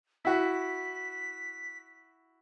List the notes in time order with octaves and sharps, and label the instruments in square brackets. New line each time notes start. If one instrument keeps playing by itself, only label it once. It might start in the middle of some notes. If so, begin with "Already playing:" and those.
[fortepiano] E4 F#4 [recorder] B6